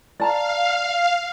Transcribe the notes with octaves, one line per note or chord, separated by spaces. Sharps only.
D5 F5 A5 A#5